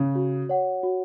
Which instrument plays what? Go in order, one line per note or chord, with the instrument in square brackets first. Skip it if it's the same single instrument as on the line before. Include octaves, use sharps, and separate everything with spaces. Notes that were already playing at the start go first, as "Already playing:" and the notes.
Already playing: [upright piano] C#3
[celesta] F#4
C#5 F#5
F#4